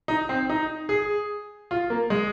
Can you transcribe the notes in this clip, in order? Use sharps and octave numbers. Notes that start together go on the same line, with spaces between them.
D#4
C4
D#4
G#4
F4
A#3
G#3